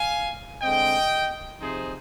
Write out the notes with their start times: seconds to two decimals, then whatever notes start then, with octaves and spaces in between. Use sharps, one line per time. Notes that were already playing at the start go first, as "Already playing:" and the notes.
Already playing: F5 G#5
0.61 D3 G#3 C4 D#5 G5
1.61 C3 F3 C4 D#4 G#4 C5